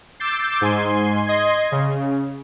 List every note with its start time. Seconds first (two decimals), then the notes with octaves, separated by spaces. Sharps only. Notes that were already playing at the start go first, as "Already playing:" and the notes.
0.20 D6 E6 G6 A6 C7
0.61 G#2 G#5 C6
1.27 D#5 C6 G#6
1.72 C#3